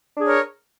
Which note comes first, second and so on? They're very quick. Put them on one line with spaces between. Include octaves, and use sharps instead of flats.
D4 G#4 C#5 A#4